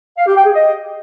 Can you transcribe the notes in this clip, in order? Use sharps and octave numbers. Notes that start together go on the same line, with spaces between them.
F5
G4
G5
G#4
D#5